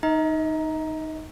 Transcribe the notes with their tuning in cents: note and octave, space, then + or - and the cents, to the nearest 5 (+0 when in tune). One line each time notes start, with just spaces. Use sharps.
D#4 +0 D#5 +40